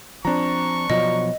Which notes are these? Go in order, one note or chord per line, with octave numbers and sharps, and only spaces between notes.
F3 C4 D4 A#5 C#6
B2 F3 F#3 D#5